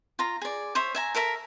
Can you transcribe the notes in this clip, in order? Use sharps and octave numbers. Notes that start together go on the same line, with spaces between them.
F4 A#5
G#4 D5
C5 C#5 E5
E5 G#5 A#5
A4 A#4 E5 A#5